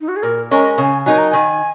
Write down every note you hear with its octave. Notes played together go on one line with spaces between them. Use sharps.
D#4
F#4
G#4
A#2 A#4
G#3 C#4 A#4 D#5
C#3 G#5
F#3 D#4 A#4 G#5
A#5
D#3 G#5